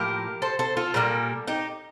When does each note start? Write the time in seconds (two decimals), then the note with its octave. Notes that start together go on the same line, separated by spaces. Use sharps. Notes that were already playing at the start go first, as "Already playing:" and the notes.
Already playing: A2 F3 A#3 G4 A#4
0.42 A4 C5
0.59 A4 C5
0.77 F4 A4
0.94 A#2 G3 A#3
1.47 D#4 G4